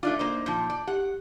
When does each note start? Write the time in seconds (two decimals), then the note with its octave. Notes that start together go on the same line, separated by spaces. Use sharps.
0.03 A3 D4 D#4 F4 D5 D6
0.19 A#3 C5 D#5
0.46 A#2 F3 A5 D6 G6
0.70 D5
0.87 G4 F#5